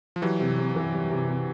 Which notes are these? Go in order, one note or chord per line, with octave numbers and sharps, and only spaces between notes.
F3
E3 F#3 G3
C3
C3
E3
G3
C3
C3